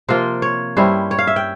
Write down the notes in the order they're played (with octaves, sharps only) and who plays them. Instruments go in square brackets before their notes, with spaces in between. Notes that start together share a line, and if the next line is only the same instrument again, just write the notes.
[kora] C3 F3 A#3 F4 C5
C#5
G2 G3 C#4 E4 C5
C#5
F5
E5
G5